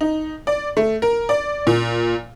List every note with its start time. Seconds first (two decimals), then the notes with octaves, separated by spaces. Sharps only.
0.01 D#4
0.47 D5
0.77 A3
1.02 A#4
1.29 D5
1.67 A#2